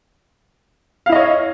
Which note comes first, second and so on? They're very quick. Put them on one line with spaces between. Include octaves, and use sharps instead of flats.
F5 E4 D#5 C#5